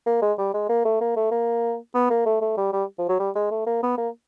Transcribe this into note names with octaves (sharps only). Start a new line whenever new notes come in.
A#3
G#3
G3
G#3
A#3
A3
A#3
A3
A#3
B3
A#3
A3
A3
G3
G3
F3
F#3
G3
G#3
A3
A#3
B3
A#3